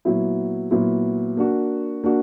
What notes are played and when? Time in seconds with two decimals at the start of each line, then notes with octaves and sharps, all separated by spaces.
0.05 A#2 F#3 B3 E4
0.71 A#2 F#3 B3 E4
1.37 A#3 D4 F#4
2.04 A#3 D4 F#4